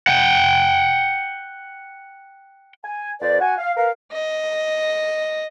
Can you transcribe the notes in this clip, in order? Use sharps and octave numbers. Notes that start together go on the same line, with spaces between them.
F#5 G5
G#5
F2 B4 C5 D5
F#4 F#5 G#5
F5
A#4 B4 F5
D#5